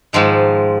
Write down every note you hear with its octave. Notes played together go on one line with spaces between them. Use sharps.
G#2 D#3 F3 G#3